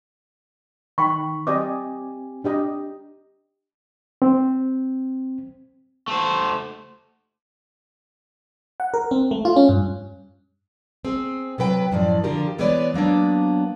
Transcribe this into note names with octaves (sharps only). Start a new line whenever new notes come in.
D#3 G5 B5 C#6
C4 G4 D5 D#5 G#5 D6
D4 G4 D#5
C4
A3 C5
F#5
A#4
C4
A3
F4
C#4
G2
C4 G#4
C3 F#3 B4 G5
F#2 A2 F3 D5
D3 F3 F4 G4 A#4
E3 G#3 B3 B4 C#5 D5
F#3 A#3 B3 D4